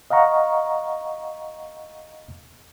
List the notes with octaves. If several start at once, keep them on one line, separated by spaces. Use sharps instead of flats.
D#5 F5 F#5 A#5 C#6